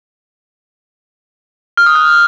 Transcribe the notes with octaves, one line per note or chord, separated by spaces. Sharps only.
F6
D#6
F#6